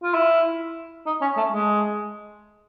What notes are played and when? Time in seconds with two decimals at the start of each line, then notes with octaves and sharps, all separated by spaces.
0.04 F4
0.15 E4
1.06 D#4
1.22 C#4
1.37 A3
1.53 G#3